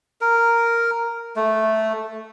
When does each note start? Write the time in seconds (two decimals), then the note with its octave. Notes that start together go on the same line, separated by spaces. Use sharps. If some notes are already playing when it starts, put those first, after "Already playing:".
0.21 A#4
1.36 A3